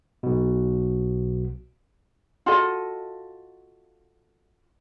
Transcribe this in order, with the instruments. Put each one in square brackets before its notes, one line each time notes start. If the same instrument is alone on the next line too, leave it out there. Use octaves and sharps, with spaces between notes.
[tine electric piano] B1 B2
[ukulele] F4 F#4 A4 D#5